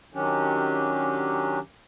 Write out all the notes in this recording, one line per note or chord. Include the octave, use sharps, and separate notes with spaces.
D#3 F#3 C#4 D4 G4